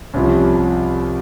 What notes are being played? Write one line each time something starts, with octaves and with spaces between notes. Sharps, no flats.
C2 C3 F3 C#4